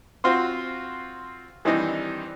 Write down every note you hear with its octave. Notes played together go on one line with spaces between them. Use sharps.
C4 F4 F#4 C5
D#3 E3 G3 C4 D4 D#4